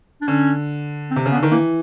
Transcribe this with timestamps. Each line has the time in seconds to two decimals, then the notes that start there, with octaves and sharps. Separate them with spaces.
0.21 D4
0.28 D3 C#4
1.11 C4
1.16 C3
1.26 C#3
1.32 B3
1.35 D3
1.43 D#3
1.51 E3 A#3